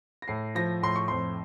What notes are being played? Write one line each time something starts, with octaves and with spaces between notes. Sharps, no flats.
A#6
A2 C7
F3 A#6
A2 C6
C#6
F2 C6